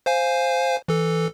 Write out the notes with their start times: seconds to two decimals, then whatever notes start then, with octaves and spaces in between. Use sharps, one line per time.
0.06 C5 F5 G#5
0.88 E3 A4